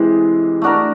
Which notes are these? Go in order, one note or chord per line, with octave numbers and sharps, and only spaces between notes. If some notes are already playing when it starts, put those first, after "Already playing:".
Already playing: C3 E3 G#3
A3 D4 F#4 A#4